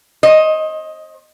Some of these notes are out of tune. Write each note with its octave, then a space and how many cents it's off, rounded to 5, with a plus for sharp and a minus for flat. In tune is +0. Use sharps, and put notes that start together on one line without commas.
C5 +45 D#5 +10